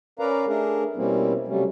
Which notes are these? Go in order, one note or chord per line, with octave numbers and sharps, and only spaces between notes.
C#4 A#4 B4 D5 F5 A#5
A3 D4 G#4 A#4
B2 G3 A#3 C4 C#4 E4
C3 F#3 G3 A3 C#4